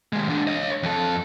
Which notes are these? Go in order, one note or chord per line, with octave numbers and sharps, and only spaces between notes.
D#2 G#3
E3 D4
C#5 D#5
F2 A4